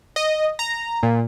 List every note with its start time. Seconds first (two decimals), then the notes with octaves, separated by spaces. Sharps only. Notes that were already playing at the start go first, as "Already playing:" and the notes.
0.16 D#5
0.59 A#5
1.03 A#2